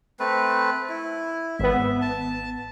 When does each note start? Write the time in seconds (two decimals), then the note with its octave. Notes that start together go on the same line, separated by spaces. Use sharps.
0.20 A3 C4 B4
0.89 E4
1.59 G#1 B3 E5
2.02 A5